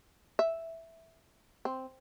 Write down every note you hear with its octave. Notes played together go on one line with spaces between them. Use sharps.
E5
C4